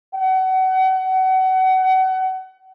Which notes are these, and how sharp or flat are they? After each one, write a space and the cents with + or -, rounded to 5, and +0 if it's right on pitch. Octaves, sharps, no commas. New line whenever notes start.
F#5 +30